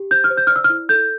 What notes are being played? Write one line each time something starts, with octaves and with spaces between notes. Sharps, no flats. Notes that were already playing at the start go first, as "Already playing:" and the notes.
Already playing: G4
C5 G6
F6
C5
G6
D5 F6
E6
F6
E4
A4 G6